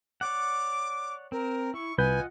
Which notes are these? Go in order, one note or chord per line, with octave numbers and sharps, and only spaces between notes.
C#5 D5 F#5 D6
C4 A#4
E4 C#6
C2 F4 B4 D#5 F#5 G#5 G6